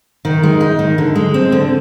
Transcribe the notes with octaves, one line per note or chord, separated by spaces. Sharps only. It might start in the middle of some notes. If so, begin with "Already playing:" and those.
D#3
G#3
D#4
D#3
D3
G#3
C4
D3